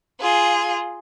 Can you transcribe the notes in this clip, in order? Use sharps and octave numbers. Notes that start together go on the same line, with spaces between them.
F4 G#4